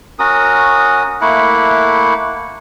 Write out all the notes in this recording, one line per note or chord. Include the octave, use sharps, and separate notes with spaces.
C#4 F#4 A#4 D#6
A3 A#3 E4 F#5